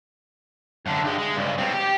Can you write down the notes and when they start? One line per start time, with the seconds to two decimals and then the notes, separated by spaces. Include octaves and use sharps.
0.86 F#2 D3
1.04 G2 G#3
1.18 G#3
1.36 C#2 G2
1.58 B2 C4
1.73 G4